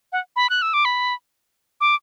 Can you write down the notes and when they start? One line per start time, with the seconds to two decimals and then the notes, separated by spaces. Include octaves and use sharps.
0.12 F#5
0.36 B5
0.50 F#6
0.62 E6
0.74 D6
0.85 B5
1.81 D6